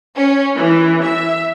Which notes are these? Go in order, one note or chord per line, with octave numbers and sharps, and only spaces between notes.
C#4
E3
E5